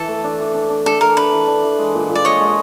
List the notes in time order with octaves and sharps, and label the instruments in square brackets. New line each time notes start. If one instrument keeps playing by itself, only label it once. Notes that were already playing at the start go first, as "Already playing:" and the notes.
Already playing: [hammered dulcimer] E3 [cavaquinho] A4
[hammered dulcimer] A3
D4
E3
D4
D4
[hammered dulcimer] D4 [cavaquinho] A4
[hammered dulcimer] A3 [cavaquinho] A#4
[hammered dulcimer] D4 [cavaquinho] B4
[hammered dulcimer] E3
D4
E3
G#3
A#2
A#2
[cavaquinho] D5
[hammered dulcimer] G#3 [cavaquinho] C#5 D#5
[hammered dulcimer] G#3